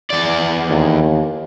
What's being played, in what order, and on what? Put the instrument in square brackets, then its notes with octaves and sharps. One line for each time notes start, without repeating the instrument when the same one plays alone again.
[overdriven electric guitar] E2 D5
[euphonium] D#2